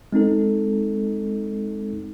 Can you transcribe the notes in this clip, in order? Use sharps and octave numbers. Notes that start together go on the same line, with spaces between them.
G#3 C4 D#4 A4